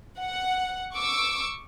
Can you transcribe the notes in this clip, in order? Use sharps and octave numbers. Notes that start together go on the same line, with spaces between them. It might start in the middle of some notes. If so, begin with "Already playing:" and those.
F#5
C#6 D6 E6